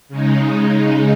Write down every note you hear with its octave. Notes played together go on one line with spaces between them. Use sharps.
C#3 G#3 D#4